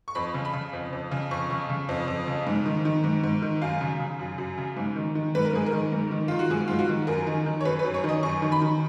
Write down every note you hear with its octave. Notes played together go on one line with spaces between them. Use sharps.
C#6
F2 B5
C#3
B5
C#3
F2
F2
C#3
F2 C#6
C#3
C#3
F2
F2
C#3
G#2
D#3
D#3
G#2
G#2
D#3
F#2 F5
C#3
C#3
F#2
F#2
C#3
G#2
D#3
D#3
G#2 B4
A#4
G#2 G#4
A#4
D#3
G#2
D#3
D#3 F4
F#4
G#2 G#4
G#2 F4
F#4
D#3
F#2 A#4
D#3
D#3
C#5
F#2 B4
B4
F#2
C#5
D#3 D#5
F#2 C#6
D#3
B5
D#3